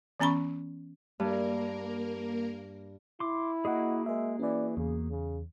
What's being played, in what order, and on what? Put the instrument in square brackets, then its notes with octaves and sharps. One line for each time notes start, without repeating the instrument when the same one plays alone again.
[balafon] E3 B3 C#4 A#5 B5 C#6
[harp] G2 [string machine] A#3 A#4
[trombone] E4 [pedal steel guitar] C6 D6
[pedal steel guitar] A#3 F#4 G#4 [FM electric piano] D#5 F#5
[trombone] G#3 [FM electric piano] A#4 E5
[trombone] E3 [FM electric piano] C#4 D5
[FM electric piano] E2 [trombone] C#3
[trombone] C#3